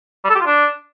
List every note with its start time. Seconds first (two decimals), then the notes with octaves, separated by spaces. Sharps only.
0.24 G3
0.30 A4
0.35 G4
0.41 F4
0.46 D4